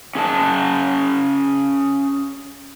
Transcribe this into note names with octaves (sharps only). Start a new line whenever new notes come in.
C#4 G#4 G#5 A5